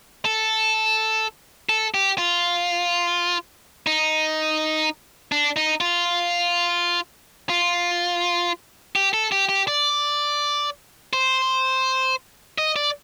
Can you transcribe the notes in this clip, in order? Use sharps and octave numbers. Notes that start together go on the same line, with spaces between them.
A4
A4
G4
F4
D#4
D4
D#4
F4
F4
G4
A4
G4
G4
D5
C5
D#5
D5